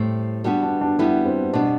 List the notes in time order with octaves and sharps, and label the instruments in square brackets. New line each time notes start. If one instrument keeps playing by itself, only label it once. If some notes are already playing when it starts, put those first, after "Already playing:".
Already playing: [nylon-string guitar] A2 G3 C4
[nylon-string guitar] G3 B3 F#4 B4 [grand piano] D4
[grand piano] D4
D4
[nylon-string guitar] G3 B3 F#4 B4 [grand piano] E4
[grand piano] C4
[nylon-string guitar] B2 G3 B3 [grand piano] D4